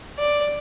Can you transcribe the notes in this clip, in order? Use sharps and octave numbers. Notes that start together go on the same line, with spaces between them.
D5